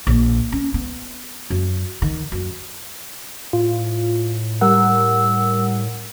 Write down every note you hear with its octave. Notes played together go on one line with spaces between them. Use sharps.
A#1
C#4
B3
F#2
D#3
F#2
A2 F4
G3 A#4 F#5 E6